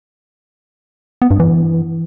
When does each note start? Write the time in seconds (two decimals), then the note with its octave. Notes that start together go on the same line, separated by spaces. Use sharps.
1.22 B3
1.31 G2
1.40 E3